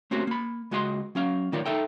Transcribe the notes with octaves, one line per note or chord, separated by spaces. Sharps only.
A3 A#3 C4 C#4 F#4 G4
A#3 B5
C#2 G#3 F#4 D#5 A#5 C6
F#3 C#4 F5
A2 D#3 F4 A#4 C#5 D5
D#4 A4 E5 G5